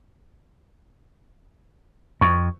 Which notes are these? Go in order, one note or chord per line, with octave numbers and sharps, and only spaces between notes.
F2 C#6